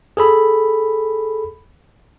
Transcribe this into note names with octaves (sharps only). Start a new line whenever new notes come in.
G#4 A4 B5